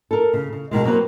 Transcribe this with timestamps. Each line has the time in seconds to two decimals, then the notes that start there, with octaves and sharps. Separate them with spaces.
0.11 A4 A#4
0.33 C#3
0.53 C#3
0.71 B2 D#3 G#3
0.84 F#3 A#3 C4 B4